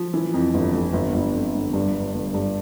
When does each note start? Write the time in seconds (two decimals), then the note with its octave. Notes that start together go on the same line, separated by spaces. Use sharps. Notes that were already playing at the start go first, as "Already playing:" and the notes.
Already playing: F3
0.14 E3
0.34 F2
0.54 G1
0.74 G1
0.93 G1
1.14 G1
1.33 F2
1.54 G1
1.73 G2
1.94 G2
2.14 G1
2.34 G2